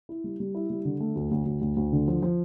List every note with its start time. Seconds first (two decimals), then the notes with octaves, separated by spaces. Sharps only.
0.09 E4
0.24 G3
0.40 G3
0.55 E4
0.70 G3
0.85 D3
1.00 A3
1.15 D2
1.31 D2
1.46 D2
1.61 D2
1.76 D2
1.92 D3
2.08 F3
2.22 F3